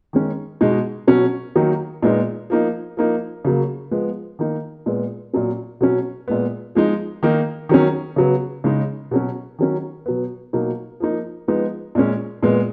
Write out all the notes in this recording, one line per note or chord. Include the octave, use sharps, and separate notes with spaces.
D#3 G#3 C#4
B2 G#3 D#4
B2 F#3 C#4
D#3 F#3 A#3 D#4
A#2 G#3 B3 D#4
F3 A#3 D#4
F3 A#3 D#4
C#3 F#3 A#3
F3 G#3 B3
D#3 A#3 D#4
A#2 G#3 B3
A#2 F#3 C#4
B2 F#3 C#4
A#2 G#3 B3
F3 G#3 D#4
D#3 A#3 D#4
D#3 F#3 C#4
C#3 F#3 B3
C#3 G#3 D#4
B2 F#3 C#4
D#3 F#3 C#4
B2 F#3 B3
B2 F#3 A#3 D#4
F3 A#3 D#4
F3 G#3 B3 D#4
A#2 G#3 C#4
A#2 G#3 B3